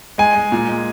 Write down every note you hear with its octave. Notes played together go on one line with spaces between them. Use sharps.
G#3 G#5
G#3
A#2
G#3